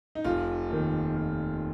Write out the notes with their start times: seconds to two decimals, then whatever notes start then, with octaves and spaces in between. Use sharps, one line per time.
0.15 D#4
0.24 F1 F4
0.70 D#2 D#3
1.16 F1